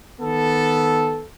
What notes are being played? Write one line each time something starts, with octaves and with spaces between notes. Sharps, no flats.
D#3 B3 A4